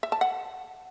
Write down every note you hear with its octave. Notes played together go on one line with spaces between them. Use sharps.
E5
A5
F#5